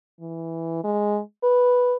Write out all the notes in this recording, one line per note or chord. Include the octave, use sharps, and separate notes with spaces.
E3
G#3
B4